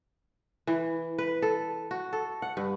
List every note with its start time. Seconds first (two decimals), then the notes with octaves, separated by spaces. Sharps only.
0.67 E3
1.19 B4
1.42 A4
1.91 F#4
2.13 A4
2.42 F#5
2.57 G2